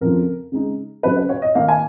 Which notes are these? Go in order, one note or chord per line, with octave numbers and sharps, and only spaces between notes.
F2 C#3 F3 A#4
C#3 G#3 D#4
C#3 F#3 C#4 B4
B4
C#5
D#5
D#3 A#3 D#4 F5
G#5